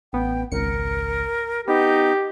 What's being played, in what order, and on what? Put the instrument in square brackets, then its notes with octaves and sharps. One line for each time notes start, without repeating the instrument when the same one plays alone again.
[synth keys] A1 B3 [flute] G5
[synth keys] G#1 C#2 C#7 [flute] A#4
[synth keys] B3 [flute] D#4 [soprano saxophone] G4